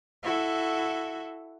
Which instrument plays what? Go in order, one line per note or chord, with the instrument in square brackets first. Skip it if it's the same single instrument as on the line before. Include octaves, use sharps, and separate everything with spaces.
[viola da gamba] E4 F#4 A4